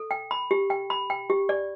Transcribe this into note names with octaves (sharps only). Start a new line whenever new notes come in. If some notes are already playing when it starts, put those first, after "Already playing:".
Already playing: A4
G5
B5
G4
G5
B5
G5
G4
D5